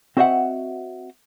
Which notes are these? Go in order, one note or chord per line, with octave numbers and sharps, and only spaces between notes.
C4 F#4 C5 D#5 E5 F#5